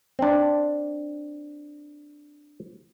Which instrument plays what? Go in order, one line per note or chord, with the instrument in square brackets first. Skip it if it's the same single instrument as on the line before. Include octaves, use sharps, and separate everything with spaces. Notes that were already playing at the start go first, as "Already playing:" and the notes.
[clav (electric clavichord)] C4 D4